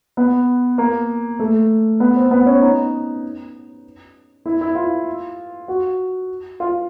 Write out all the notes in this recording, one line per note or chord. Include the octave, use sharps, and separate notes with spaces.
B3
A#3
A3
B3
C4
B3
C#4
D#4
E4
E4
F4
F#4
F4